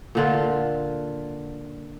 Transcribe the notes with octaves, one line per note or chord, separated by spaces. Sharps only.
A#2 D3 F4